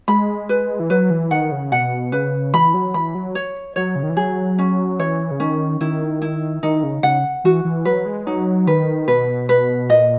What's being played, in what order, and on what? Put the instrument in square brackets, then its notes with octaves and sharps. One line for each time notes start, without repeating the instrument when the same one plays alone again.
[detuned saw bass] G#3 [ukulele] B5
[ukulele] B4
[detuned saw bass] E3
[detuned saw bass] F#3 [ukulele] B4
[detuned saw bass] E3
[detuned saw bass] D#3 [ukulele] F#5
[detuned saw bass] C#3
[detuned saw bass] B2 [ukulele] F#5
[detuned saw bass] C#3 [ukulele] B4
[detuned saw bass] E3 [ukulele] B5
[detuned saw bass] F#3
[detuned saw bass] E3 [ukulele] B5
[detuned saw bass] F#3
[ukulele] C#5
[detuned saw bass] F#3 [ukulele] C#5
[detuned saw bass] C#3
D#3
E3
[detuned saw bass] F#3 [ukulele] G#4
[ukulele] C#4
[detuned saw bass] E3 [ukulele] C#5
[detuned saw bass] C#3
[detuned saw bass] D#3 [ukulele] C#4
[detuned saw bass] D#3 [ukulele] E4
[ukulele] E4
[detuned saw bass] D#3 [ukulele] D#4
[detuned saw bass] C#3
[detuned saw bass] C#3 [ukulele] F#5
[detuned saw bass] E3 [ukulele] F#4
[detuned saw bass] E3
[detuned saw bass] F#3 [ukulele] B4
[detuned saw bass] G#3
[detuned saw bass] F#3 [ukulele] D#4
[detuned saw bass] D#3 [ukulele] B4
[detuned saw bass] B2 [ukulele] B4
[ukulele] B4
[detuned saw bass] A#2 [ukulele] D#5